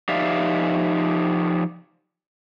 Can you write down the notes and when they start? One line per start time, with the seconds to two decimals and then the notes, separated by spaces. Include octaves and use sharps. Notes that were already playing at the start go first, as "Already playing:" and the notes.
0.09 F3 D#4 G4 D5 E5 F5